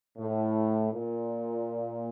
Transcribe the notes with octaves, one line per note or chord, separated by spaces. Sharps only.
A2
A#2